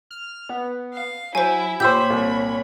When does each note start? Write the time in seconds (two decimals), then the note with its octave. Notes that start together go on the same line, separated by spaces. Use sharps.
0.11 F6
0.49 B3
0.93 F5
1.35 F#3 E4 C5 G#5
1.80 A#2 G4 C5 C#5 B5 E6 G6
2.10 C2